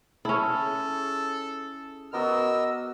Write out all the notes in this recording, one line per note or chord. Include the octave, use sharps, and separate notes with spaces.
C#4 E4 G#4 A4 A5
B3 F#4 A#4 D5 D#5 E6